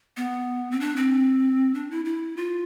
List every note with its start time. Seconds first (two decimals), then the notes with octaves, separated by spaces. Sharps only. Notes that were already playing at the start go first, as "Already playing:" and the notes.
0.17 B3
0.71 C4
0.80 D4
0.96 C4
1.74 D4
1.91 E4
2.05 E4
2.37 F4